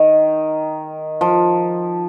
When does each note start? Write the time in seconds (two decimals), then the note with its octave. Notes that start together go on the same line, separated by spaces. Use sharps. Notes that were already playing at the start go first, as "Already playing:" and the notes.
Already playing: D#3
1.21 F3